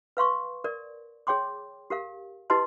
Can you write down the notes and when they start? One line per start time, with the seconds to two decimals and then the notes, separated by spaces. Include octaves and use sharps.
0.17 B4 F5 C6 C#6
0.64 A#4 D5
1.27 G#4 C#5 G5 C6 D6
1.90 G4 A#4 F5
2.50 E4 G4 B4 D#5 A5 C6